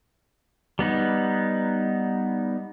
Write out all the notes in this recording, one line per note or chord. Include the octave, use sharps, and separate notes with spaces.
G3 B3 D#4